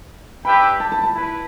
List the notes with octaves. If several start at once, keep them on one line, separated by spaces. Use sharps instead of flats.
D4 G4 B4 E5 G5 B5
A5
A5
A5
E4 B4